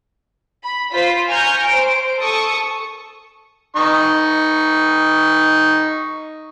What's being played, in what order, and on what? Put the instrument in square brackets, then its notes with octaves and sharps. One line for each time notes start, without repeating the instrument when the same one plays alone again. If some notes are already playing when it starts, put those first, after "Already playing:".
[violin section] B5
F4 C5 B6
G#5 A#5 C#6 F6 G6
C5 D7
A4 C#6 D#6 C#7
[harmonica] D#4 C#6